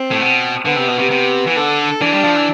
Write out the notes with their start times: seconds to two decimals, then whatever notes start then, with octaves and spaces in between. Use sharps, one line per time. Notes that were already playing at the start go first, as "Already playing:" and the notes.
Already playing: C4
0.11 A2
0.21 B2
0.65 D3 B3
0.76 C3
0.88 B2
0.99 C3
1.11 C3
1.47 E3
1.56 D3 A4
2.01 E3 D4
2.13 G3
2.24 F3
2.36 E3